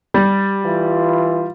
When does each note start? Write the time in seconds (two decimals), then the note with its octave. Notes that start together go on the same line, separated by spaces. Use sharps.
0.14 G3
0.64 E3 F4